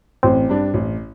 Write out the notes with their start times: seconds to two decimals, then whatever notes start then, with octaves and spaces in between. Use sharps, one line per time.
0.23 A1 C4
0.49 G2 G3 D4
0.74 A1